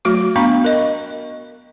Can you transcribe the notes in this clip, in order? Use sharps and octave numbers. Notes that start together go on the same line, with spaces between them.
F#3 A3 F#4 D6
B3 D4 F5 A#5 B5 C#6
A#4 D#5